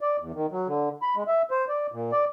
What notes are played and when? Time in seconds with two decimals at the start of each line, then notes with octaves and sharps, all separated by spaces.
0.01 D5
0.20 E2
0.34 D#3
0.51 F#3
0.68 D3
1.02 B5
1.16 G#3
1.28 E5
1.51 C5
1.69 D5
1.92 A#2
2.12 D5